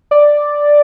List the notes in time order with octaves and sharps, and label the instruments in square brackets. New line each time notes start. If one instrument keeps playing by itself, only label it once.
[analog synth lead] D5